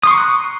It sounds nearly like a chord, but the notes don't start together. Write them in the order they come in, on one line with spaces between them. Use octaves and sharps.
D#6 C6 C#6 A#5 F#6